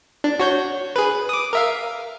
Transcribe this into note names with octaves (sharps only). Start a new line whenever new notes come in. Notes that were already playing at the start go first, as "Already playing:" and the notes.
D4
F#4 C#5 G6
G#4 B4
D6 D#6
A#4 E5 F5